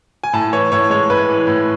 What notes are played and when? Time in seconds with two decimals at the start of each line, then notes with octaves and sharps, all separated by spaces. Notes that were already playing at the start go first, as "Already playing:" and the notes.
0.24 G#5
0.33 A2 A5
0.53 E3 C#5
0.72 A2 C#5
0.90 G#3 C#5
1.10 A2 B4
1.29 E3
1.47 A2